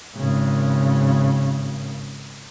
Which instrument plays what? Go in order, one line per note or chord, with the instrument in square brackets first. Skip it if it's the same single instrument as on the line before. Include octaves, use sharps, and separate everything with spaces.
[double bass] G#1 C#3